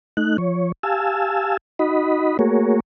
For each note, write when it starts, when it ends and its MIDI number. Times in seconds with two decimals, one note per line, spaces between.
0.17 0.37 57
0.17 0.37 63
0.17 0.37 90
0.38 0.72 53
0.38 0.72 73
0.83 1.57 67
0.83 1.57 77
0.83 1.57 80
0.83 1.57 81
0.83 1.57 88
1.79 2.37 63
1.79 2.37 66
1.79 2.37 75
1.79 2.37 83
2.39 2.80 57
2.39 2.80 58
2.39 2.80 66
2.39 2.80 68
2.39 2.80 70
2.39 2.80 73